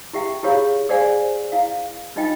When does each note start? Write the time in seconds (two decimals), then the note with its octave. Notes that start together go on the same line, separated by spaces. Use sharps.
0.13 E4 G4 E5 F#5 G5
0.43 E4 F4 G4 G#4 C#5 F5
0.89 G#4 C5 D5 F5 F#5 G#5
1.52 E4 F5
2.16 D4 D#4 F4 D#5 G5